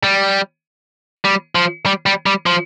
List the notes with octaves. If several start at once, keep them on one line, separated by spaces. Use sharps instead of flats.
G3
G3
F3
G3
G3
G3
F3